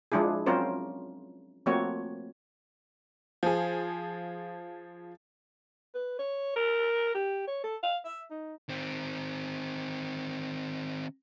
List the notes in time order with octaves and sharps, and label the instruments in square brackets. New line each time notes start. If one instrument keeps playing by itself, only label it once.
[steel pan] F3 G#3 D4 E4 G#4
F#3 C4 C#4 F4 A#4 C5
F3 A3 A#3 C4 F#4 C#5
[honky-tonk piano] F3 G#4
[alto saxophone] B4
C#5
A#4
G4
C#5
A4
F5
E5
D#4
[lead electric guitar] D#3 C4